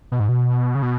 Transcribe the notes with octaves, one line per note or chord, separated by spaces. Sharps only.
B2
G#2
B2
C#3
B2